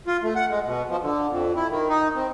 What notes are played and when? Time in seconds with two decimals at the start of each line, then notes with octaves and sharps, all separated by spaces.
0.07 F4
0.23 A3
0.36 F#5
0.50 G#3
0.64 B2
0.90 F3
1.01 D3
1.29 F2
1.56 E4
1.70 D#3
1.89 D#4
2.15 C4